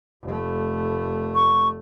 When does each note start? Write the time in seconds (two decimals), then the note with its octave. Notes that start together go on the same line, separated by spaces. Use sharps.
0.23 F1 A3
1.35 C#6